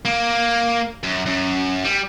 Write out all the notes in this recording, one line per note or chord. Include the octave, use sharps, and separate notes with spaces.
A#3
F#2
F#2
G3